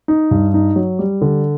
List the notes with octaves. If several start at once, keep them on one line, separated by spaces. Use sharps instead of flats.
D#4
G2
D#4
F#3
G3
D3